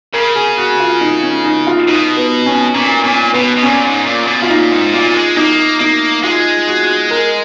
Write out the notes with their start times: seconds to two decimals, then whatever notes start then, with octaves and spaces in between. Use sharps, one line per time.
0.13 C#3 A#4
0.36 G#4
0.57 F#4
0.80 F4
1.01 D#4
1.23 C#4
1.45 D#4
1.67 F4
1.88 B2 D#4
2.17 B3
2.46 C#4
2.75 A#2 C#4
3.04 A#2 C#4
3.33 B2 B3
3.56 B2
3.63 A#2 C#4
3.84 G#2
4.06 A#2
4.27 B2
4.42 F4
4.50 A#2 D#4
4.72 G#2
4.93 A#2 F4
5.14 G#3
5.37 A#3 D#4
5.80 A#3 D#4
6.23 G#3 F4
6.68 F#4
7.11 A#4